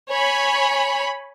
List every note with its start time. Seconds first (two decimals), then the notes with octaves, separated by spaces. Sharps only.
0.11 C#5 G#5 B5